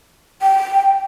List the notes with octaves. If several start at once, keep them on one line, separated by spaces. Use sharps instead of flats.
G5